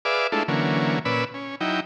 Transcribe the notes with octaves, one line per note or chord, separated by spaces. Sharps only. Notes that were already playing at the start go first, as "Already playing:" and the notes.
G#4 B4 D5 E5 F5 D6
G#3 A3 D4 E4 F4 A4
D3 E3 F#3 A#3 C#4
A#2 C#4 B4 D5 B5 E6
C#4
F#3 D#4 E4 G5